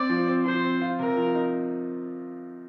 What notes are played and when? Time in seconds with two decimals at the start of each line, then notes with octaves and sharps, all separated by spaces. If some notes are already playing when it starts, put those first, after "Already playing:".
Already playing: C4 D5
0.09 F3
0.28 C4
0.45 F3 C5
0.63 C4
0.82 F4
0.99 C3 A#4
1.17 F3
1.35 D#4